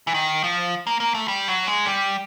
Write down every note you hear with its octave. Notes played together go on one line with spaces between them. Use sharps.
E3
D#3
F3
A#3
A#3
A3
G3
F#3
G#3
G3